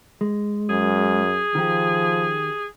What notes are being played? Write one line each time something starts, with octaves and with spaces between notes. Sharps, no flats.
G#3
F#2 G#4
D#3 F3 G4